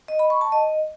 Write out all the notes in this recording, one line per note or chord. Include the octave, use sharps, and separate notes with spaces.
D#5
B5
C#6
A5
D#5